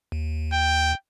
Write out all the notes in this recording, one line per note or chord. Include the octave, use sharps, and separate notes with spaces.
D#2
G5